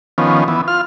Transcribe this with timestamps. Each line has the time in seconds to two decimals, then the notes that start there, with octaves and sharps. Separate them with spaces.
0.18 D#3 F3 B3 C#4
0.48 E3 B3
0.68 F4 F6